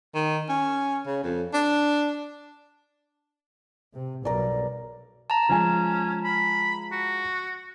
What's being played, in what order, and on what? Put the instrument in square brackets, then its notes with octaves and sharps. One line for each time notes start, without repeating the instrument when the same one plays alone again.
[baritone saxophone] D#3
C#4
C#3
F2
D4
[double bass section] C3
[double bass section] B1 G2 [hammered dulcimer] A#4 D5
[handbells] A5 A#5
[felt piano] F3 G#3 G#5 [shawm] C#4
[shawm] B5
F#4